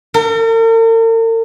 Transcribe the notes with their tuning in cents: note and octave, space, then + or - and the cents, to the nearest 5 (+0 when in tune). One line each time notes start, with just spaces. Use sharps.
A#4 -45